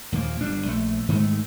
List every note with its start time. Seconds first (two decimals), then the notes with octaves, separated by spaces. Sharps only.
0.12 D#2 A#2 F3 A#3
0.41 G1 G3 D4
0.66 A#1 A3
1.08 G#2 D#3 G#3 A3